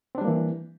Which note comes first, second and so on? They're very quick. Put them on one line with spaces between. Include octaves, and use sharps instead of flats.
C4 D4 G3 A#3 E3